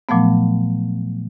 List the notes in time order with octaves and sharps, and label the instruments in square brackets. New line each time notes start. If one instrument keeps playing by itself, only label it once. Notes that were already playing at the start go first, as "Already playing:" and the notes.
[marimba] A#2 F3 F#3 A3 B3